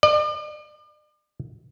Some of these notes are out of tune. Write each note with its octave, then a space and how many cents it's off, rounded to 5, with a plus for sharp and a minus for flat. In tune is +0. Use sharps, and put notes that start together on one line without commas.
D5 +40